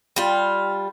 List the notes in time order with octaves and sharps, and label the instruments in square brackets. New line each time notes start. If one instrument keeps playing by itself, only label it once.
[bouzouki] G3 F4